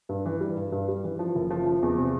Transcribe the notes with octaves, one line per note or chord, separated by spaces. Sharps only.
G2
E3
G3
G2
G2
G3
E3
F3
F#1
F3
F3
E2
C3